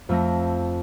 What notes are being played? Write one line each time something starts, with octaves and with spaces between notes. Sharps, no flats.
F2 A3 A#6